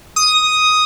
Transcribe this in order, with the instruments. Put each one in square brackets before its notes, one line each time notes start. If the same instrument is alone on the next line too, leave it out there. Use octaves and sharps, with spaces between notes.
[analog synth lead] D#6